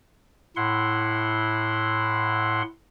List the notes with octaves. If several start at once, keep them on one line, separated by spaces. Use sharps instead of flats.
A2 E4 F#5 C6